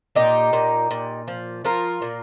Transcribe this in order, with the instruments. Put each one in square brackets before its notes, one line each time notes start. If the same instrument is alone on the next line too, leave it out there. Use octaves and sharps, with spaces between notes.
[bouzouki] A#2 D#4 G4
A#2
A#2
F3
F3 F4 A#4
A#2